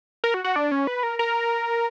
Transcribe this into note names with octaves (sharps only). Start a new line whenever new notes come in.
A#4
F#4
F#4
D4
C#4
B4
A#4
A#4